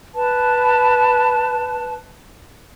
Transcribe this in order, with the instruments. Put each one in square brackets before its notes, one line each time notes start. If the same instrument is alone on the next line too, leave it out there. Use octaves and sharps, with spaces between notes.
[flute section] B4 A5